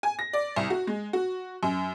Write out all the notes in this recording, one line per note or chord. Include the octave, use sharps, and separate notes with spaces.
G#5
A#6
D5
C2
F#4
G#3
F#4
F#2